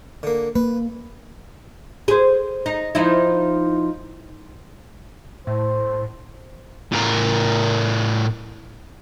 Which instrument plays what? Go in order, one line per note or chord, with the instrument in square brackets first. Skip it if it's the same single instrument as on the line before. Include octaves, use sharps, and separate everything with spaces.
[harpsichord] D3 A#3
[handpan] A#3 [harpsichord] B4
[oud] G#4 C5
D#4
F3 D#4 E4
[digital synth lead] A2 [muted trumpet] C5
[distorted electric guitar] A2 A#4